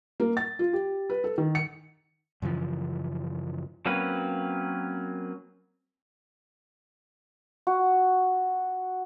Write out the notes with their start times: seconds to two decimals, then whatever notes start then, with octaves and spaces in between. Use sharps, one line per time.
0.20 A#3
0.37 A6
0.59 F4
0.73 G4
1.10 B4
1.24 A4
1.38 D#3
1.55 C#7
2.42 F#2 C#3 E3 F3
3.86 F#3 A#3 C4 C#4 B4
7.67 F#4